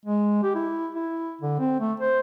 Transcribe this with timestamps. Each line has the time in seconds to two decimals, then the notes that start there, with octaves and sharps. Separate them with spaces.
0.06 G#3
0.43 G4
0.55 E4
0.95 E4
1.42 D3
1.59 C4
1.80 A3
2.00 C5